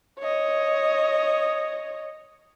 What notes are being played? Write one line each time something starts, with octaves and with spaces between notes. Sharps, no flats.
C#5 D#5